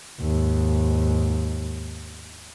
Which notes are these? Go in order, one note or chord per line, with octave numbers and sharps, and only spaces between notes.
D#2 G#2